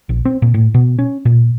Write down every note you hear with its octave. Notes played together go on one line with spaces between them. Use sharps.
A#1
C4
A#2
A2
B2
C#4
A#2